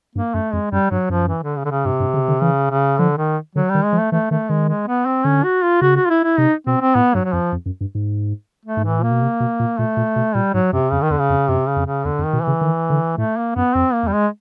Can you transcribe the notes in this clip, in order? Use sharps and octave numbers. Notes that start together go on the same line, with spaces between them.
G2 A#3
F#2 A3
F2 G#3
F#2 G3
G2 F#3
F#2 F3
E3
D3
C#3
D3
C#3
G2 C3
G2
C#3
D3
C#3 E3
C#3
D3 F3
D#3
D3 F#3
G3
D#3
G#3
F3
A3
E3 A3
D#3 A3
D#3 G#3
G#3
B3
C4
D3 C#4
F#4
F4
C#3 F#4
F#4
F4
E4
E4
C3 D#4
B2 C4
C4
A2 B3
G2 F#3
F#3
F2 F3
F2
F#2
G2
G#2
A3
G#2
A2 E3
A#2 A#3
B2
C3
B2
A#2
A#2 A3
A#2
B2
A#2 G3
G#2 F#3
F#2 C3
F2 C#3
D#3
E2 D3
C#3
F2
F#2 C3
C#3
F2
C#3
E2 D3
F2
D#3
B2
E3
C#3
D#3
D3
A2 A3
A#3
F#2 B3
F2 C4
A#3
E2
G3
G#3